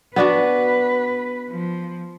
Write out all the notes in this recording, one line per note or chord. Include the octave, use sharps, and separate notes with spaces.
B3 D4 F#4 B4
F3